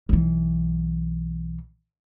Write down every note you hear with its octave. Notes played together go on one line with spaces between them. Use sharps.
B1 E3